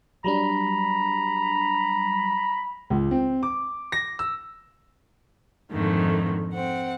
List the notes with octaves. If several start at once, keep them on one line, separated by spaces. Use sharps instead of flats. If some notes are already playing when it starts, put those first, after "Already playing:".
F#3 G3 D4 A#5 B5
C#2
C4
D6
A#6
E6
F2 G#2 D3 D#3 A3
C4 F#5